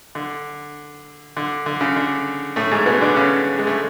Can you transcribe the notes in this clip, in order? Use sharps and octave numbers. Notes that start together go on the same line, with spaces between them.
D3
D3
D3
C#3
D3
A2 A3
G#2 G#3
B2 B3
D3 D4
C#3 C#4
G#3
A3